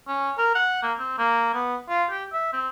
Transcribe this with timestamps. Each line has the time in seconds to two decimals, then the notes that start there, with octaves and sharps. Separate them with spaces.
0.08 C#4
0.38 A#4
0.55 F#5
0.83 A#3
0.99 C4
1.18 A#3
1.54 B3
1.89 F4
2.10 G4
2.33 E5
2.53 C4